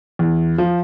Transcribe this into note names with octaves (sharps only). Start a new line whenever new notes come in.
E2
F3